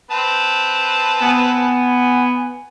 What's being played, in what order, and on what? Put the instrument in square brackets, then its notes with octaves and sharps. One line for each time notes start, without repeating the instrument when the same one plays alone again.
[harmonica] C4 B4 A5
[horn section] B3 G#5